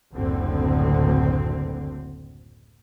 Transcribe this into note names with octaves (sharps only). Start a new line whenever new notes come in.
F#1 D2 A2 D3 C4